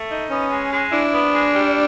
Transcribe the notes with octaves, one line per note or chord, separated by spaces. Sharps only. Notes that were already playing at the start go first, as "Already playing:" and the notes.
Already playing: A3
D#4
B3 C#4
G#3
G#3
D4 E4
B3
G#3
G3